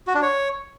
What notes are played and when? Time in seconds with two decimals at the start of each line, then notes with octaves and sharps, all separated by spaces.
0.07 F#4
0.15 D4
0.22 C#5